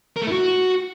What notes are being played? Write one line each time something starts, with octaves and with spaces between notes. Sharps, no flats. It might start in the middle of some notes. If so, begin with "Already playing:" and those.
A#4
A3
E4
F#4